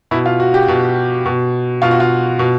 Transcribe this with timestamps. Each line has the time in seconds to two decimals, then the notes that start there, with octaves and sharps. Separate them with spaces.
0.11 B2 E4
0.26 F4
0.40 F#4
0.54 G4
0.68 B2
1.26 B2
1.82 B2 F4
1.91 F#4
2.00 F4
2.39 B2